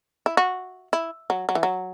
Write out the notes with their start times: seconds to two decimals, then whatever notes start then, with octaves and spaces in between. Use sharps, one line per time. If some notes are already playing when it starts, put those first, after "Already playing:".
0.26 E4
0.37 F#4
0.93 E4
1.30 F#3
1.49 F#3
1.55 E3
1.63 F#3